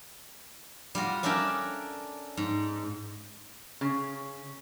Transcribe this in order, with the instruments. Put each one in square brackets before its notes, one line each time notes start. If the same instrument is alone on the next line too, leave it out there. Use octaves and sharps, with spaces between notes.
[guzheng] G3 F4 F#4
C#4 D4 A4 A#4 E5 G5
G#2
[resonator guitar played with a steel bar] C#3